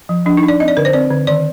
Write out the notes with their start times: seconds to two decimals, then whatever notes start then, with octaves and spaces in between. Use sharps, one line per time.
0.09 F3
0.26 F3 D4
0.37 D#4
0.43 D4
0.48 D5
0.60 C4 D#5
0.68 D5
0.77 D3 A#4
0.85 C5
0.93 C4 D5
1.10 D3
1.27 D#3 D5